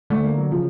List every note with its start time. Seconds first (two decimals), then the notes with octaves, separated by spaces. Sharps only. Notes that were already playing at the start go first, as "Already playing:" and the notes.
0.10 D3 A3
0.24 A#3
0.38 F#3
0.51 C#3 F3